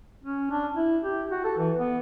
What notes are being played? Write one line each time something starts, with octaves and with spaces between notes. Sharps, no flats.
C#4
D4
E4
G4
F#4
A4
E3
B3